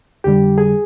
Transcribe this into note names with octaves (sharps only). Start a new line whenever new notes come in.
F2 D3 G3 G4 G5
G#4 G#5